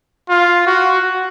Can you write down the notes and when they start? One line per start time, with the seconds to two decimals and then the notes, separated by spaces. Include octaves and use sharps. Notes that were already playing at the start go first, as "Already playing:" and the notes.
0.29 F4
0.67 F#4